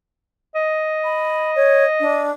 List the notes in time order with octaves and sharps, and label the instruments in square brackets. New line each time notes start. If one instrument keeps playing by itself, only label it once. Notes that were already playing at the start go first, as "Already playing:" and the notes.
[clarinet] D#5
[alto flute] B5
C#5
D4